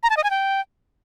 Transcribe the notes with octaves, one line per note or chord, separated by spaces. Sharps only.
A#5
A5
D#5
G#5
G5